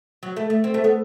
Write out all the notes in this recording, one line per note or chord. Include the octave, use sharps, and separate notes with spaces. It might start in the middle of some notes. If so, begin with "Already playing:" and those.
F#3
A3
A3
C4
A3
B3